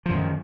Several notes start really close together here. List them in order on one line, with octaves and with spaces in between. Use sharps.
F3 F#2 D#3